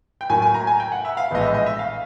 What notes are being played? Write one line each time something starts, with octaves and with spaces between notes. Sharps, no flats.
G5
A2 F#3 A#3 G#5
G#5
A#5
G#5
G5
F#5
E5
F5
A#1 A2 E3 G#3 B3 D#5
E5
D#5
E5
F5